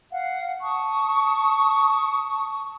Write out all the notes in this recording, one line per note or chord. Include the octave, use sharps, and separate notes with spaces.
F5 F#5
A5 C#6 D#6